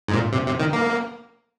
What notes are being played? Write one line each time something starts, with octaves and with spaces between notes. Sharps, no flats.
G#2
A#2
C3
C3
D#3
A#3